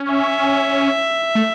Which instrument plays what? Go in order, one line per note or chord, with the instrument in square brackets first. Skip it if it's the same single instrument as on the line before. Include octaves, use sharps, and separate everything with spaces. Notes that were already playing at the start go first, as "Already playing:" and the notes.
Already playing: [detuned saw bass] C#4
[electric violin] E5
[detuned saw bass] A3